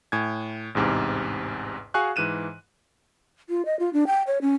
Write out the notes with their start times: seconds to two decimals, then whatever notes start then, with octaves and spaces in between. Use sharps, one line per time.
0.12 A2 G#5 G#6
0.75 A1 E2 G#2 C3
1.94 F#4 G#4 F5 G#5 C#6 F#6
2.16 G#2 E3 F#6 D#7 E7
3.49 F4
3.65 D#5
3.79 F4
3.93 D4
4.07 G5
4.27 C#5
4.42 C#4